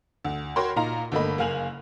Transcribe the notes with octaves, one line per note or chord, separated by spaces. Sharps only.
D2
F#4 A#4 C#5 G5 B5 C6
A#2 D#4 F5 A#5
G1 D3 A3 A#3 D#5 B5
F#1 A#3 F5 G#5 F7 F#7